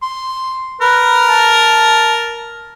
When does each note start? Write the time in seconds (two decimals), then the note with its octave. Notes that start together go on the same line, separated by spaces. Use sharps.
0.02 C6
0.81 A#4 B4
1.29 A5